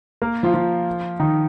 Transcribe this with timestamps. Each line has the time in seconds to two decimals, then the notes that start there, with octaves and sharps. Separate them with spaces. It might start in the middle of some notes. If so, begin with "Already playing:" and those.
0.22 A#3 A#4
0.43 F3 F4
0.54 F3 F4
1.19 D#3 D#4